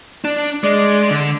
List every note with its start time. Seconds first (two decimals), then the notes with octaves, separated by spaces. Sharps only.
0.25 D4
0.64 G#3 D5
1.11 D3